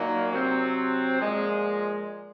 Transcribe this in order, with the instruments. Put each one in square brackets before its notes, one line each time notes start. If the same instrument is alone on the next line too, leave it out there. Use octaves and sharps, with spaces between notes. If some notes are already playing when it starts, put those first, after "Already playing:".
Already playing: [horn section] A#2 F#3 A#3 D#4
C3 F#3 C4
A#2 F3 G#3